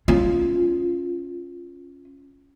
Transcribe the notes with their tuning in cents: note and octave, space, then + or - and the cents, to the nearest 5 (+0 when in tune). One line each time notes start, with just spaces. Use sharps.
C#4 +0 F4 -5